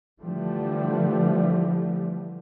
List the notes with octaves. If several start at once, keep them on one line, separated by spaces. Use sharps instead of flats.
D3 E3 F3 G3 A3